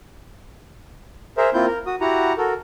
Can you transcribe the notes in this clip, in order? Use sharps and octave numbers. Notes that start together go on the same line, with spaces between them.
G#4 A#4 C5 E5
A#3 C4 E4 F4 G6
A#4
F#4 D#6
E4 F#4 G4 F#5 A#5
F#4 A4 A#4